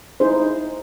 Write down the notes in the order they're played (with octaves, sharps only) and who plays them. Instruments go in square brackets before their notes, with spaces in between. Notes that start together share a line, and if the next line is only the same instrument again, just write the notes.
[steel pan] D#4 E4 G#4 C5